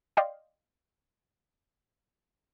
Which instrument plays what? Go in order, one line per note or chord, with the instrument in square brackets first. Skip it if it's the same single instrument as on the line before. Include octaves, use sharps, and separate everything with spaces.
[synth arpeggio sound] D5 D#5 F5 G5 C6